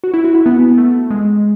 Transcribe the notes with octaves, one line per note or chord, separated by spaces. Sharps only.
F#4
E4
F#4
E4
B3
A3
G#3